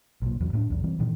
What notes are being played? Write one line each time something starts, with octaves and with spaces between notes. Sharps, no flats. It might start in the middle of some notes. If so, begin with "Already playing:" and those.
B1 A#2
E2 F#3
A2 A#3 D4
B1 E2 B2
E3 G3 C4
G2 A#2 D#3 E3